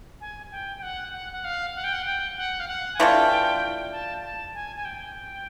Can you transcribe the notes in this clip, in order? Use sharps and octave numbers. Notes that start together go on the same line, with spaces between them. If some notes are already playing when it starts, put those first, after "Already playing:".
G#5
G5
G5
F#5
F#5
F#5
F5
F#5
G5
F#5
G5
F#5
F5
F#5
G#5
E3 A3 D4 F4 G5
A5
A5
G#5
G#5
G5